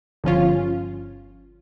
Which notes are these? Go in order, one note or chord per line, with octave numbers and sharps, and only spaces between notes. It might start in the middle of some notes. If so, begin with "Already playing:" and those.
G1 F3 C#4 F4